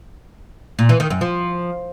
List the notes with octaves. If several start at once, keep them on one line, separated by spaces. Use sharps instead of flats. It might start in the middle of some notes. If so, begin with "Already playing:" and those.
A#2
E3
D#3
F#2
F3